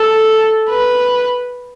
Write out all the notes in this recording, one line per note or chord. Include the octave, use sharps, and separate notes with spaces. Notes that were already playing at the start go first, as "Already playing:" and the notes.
Already playing: A4
B4